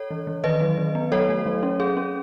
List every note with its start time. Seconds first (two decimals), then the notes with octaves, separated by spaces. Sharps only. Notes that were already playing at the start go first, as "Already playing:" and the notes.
Already playing: A4 C#5
0.11 E3
0.27 E3
0.44 D#3 B4 D#5
0.61 F#3
0.78 D#3
0.95 B3
1.12 F#3 A4 C#5
1.29 A3
1.46 F#3
1.63 C#4
1.80 C#4 G#4
1.97 C#4